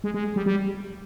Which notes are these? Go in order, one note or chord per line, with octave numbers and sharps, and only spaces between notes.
G#3
G#3
G3
G3